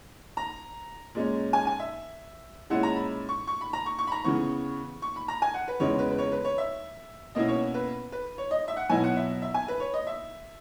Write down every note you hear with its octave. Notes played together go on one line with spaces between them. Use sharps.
A#5
A#2 G#3 C#4
G#5
G#5
E5
A#2 G#3 C#4 E4 F#5
A#5
B5
C#6
C#6
B5
A#5
C#6
C#6
B5
A#5
C#3 E3 B3 C#6
C#6
B5
A#5
G#5
F#5
B4
E2 C#3 G#3 C#5
B4
B4
C#5
B4
C#5
E5
B2 A#3 C#4 E4 D#5
C#5
B4
B4
C#5
D#5
E5
F#5
B2 F#3 B3 E4 G#5
F#5
E5
E5
G#5
B4
C#5
D#5
E5